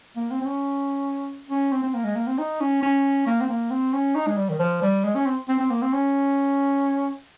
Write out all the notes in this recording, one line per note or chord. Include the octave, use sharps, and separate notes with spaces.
A#3
C4
C4
C#4
C#4
C4
C4
A#3
G#3
A#3
C4
D#4
C#4
C#4
A#3
C4
A#3
C4
C#4
D#4
G#3
G3
D#3
F3
G3
G#3
C#4
C4
C4
C4
A#3
C4
C#4